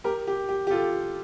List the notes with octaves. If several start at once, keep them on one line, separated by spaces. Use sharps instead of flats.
G4 A#4
G4
G4
G4
F4 A4